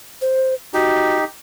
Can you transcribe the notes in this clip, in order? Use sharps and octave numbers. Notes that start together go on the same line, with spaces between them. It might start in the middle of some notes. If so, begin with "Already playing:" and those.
C5
D#4 F#4 G4